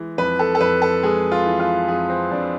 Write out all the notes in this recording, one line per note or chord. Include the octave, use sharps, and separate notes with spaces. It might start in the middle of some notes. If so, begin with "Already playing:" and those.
Already playing: E3 G#3
F2 B4
A4
A4
F2 B4
A4
G#3 G#4
F4
E3
F4
F2 G#4
C4
F2 D4